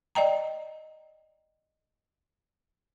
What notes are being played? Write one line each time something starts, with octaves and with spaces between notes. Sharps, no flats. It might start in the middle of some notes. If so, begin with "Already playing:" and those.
D5 D#5 G5 A#5